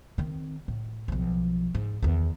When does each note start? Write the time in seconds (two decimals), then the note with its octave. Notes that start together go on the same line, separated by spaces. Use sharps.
0.18 D#3 C4
0.68 A2
1.08 B1 F3
1.74 G#2
2.02 E2 D#3